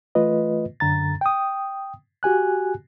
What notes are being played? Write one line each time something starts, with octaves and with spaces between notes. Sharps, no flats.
E3 A3 F4 B4 D#5
F#2 D3 A#5 A6
G5 D#6
F#4 G4 G#5 F#6